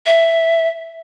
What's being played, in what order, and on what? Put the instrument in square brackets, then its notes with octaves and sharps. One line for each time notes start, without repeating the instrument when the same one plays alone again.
[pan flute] E5